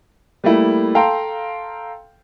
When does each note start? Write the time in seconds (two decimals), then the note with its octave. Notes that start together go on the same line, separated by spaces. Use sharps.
0.44 G3 A3 A#3 E4
0.95 A4 F5 G5 A#5 C6